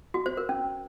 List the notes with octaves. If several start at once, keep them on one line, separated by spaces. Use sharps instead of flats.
F#4
C5
A#4
C#4